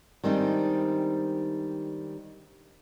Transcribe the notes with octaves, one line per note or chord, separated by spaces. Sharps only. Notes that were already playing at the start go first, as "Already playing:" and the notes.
D#3 G3 G#3 C4 D4 D#4